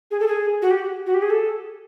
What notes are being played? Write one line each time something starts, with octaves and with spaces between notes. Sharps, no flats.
G#4
A4
G#4
F#4
G4
F#4
G4
G#4
A4